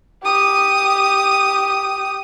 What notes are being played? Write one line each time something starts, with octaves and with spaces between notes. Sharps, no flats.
G4 D#6